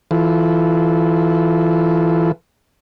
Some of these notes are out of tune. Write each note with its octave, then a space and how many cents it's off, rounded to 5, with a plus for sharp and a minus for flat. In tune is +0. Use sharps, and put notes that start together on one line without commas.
E3 +0 F4 +0 A4 -20